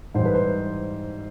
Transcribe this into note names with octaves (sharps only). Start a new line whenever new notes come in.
G#2 E3 G3 C5
B4
C5